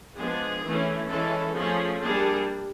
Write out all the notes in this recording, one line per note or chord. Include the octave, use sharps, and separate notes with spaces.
F3 G#3 B3 D4 G#4
E3 A3 C#4
E3 G#3 C#4 A4
F3 A3 C#4 G#4
G3 A#3 D4 G#4